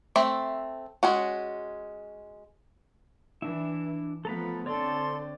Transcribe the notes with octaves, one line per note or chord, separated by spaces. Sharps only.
A3 C4 E5
G#3 C#4 F#4
E3 D4 E4
F3 A3 B3 A4 A#5 B5
D3 C4 A4 C#5 D5 C6